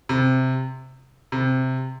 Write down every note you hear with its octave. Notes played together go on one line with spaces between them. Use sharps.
C3
C3